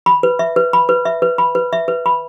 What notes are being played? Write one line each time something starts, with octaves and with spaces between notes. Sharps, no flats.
B5
B4
E5
B4
B5
B4
E5
B4
B5
B4
E5
B4
B5